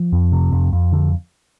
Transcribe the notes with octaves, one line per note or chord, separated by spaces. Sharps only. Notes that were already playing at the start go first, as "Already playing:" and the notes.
Already playing: F3
F2
C3
F2
F2
D3